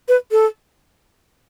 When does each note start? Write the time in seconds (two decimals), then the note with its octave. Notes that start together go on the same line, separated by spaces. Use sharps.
0.08 B4
0.31 A4